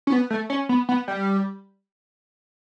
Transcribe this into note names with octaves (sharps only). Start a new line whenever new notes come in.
C#4
B3
A3
C#4
B3
B3
G3